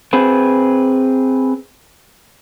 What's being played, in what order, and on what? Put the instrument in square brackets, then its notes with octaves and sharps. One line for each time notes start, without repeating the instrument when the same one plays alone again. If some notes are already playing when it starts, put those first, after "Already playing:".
[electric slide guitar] C4 G#4 B4